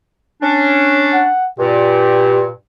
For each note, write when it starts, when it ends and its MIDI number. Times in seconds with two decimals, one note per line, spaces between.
0.42 1.27 61
0.42 1.27 62
1.13 1.49 78
1.59 2.47 43
1.59 2.47 46
1.59 2.42 67